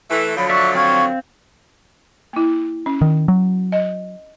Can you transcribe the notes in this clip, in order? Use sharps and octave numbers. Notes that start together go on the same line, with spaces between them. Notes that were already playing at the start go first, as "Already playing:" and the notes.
E3 A3
D3 F3 F#3 C#5 B5
D5 E5 C#6 F#6
C4 F5 C#6 F6 G#6
A#3 E4
C#4
D#3
F#3
D#5